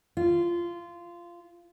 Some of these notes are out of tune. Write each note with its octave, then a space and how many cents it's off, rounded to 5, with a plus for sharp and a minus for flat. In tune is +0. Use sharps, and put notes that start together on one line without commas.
F4 -15